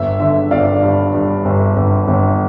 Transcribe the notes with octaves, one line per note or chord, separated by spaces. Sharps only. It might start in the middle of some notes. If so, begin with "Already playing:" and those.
Already playing: G1 E5
D3 E5
G1 D5 F5
G2
G2
G1
G1
G1